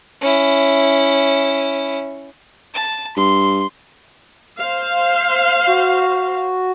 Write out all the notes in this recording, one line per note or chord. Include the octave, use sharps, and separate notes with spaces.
C#4 E4
A5
G2 C6
C5 F5
F#4